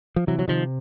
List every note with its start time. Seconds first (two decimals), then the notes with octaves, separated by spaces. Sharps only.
0.16 F3
0.27 C3 E3 F#3
0.39 F#3
0.48 C3 D#3 F3